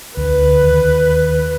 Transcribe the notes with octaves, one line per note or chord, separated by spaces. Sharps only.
D2 B4
D#2